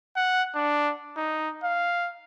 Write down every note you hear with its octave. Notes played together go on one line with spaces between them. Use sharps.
F#5
D4
D#4
F5